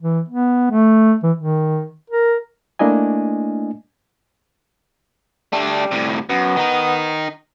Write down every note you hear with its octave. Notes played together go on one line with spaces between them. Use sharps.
E3
B3
A3
E3
D#3
A#4
A3 A#3 D4 E4 D#5 G#5
G3 A3 D4
A2 C3
F#2 B3
D#3 D#4